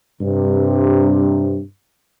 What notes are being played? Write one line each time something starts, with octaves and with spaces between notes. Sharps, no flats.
G2 C3